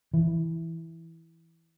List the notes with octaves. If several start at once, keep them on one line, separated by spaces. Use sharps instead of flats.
E3